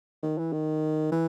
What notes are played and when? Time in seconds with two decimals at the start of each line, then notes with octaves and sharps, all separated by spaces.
0.23 D#3
0.38 E3
0.53 D#3
1.12 E3